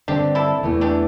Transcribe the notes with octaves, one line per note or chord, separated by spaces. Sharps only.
G2 D3 C4 D4 G4
E4 A4
E2 E3 A3
D4 G4